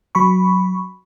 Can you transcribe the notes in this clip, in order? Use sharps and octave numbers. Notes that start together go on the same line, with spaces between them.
F#3 B5 C#6